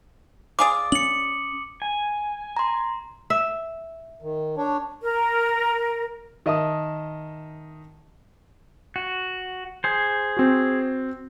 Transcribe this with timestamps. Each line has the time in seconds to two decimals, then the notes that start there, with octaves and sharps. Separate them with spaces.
0.59 F4 G#4 D5 D6 D#6
0.92 C#4 C#7 F#7
1.82 G#5
2.57 A#5 C6
3.30 E5
4.22 D#3
4.57 D4 C#5
5.02 A#4
6.46 D#3 D#5 E5 A5 D#6
8.96 F#4
9.84 G#4 C5
10.37 C4 F#4